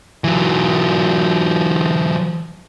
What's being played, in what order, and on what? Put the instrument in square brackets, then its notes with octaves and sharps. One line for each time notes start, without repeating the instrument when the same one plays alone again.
[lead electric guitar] E3 F#3